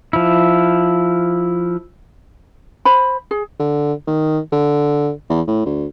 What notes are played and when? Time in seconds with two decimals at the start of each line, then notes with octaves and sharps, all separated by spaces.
0.13 F3 E4
2.85 C5 B5
3.31 G#4
3.59 D3
4.07 D#3
4.52 D3
5.30 E2
5.47 A2
5.66 D2